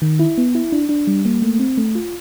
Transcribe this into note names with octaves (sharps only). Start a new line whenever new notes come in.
D#3
E4
B3
E4
D4
D4
G3
A#3
A3
C4
A3
F4